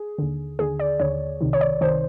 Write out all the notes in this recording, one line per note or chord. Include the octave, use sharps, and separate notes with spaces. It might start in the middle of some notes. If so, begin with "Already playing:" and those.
Already playing: G#4
D#2 D3
D#2 D3 G#4
D5
D#2 D3 C#5
C2 C3 D#3
C#5
D5
C2 C3 D#3 C5